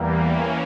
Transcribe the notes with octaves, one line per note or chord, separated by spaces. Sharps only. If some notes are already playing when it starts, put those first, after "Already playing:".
Already playing: E2 E3 G3 A#3
E3 A#3 C#4